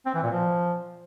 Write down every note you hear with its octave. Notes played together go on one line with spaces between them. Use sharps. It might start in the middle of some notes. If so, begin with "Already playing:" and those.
C4
E3
A#2
F3